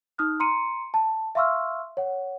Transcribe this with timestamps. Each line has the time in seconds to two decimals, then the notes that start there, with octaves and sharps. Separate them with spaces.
0.18 D#4 D#6 F6 F#6
0.40 A#5 C6 C#7 D#7
0.94 A5
1.35 E5 F5 C6 C#6 E6 F6
1.97 C#5 F#5